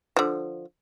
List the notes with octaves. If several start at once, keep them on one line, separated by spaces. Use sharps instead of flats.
D3 F3